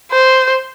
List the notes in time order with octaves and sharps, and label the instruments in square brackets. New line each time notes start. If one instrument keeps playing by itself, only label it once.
[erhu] C5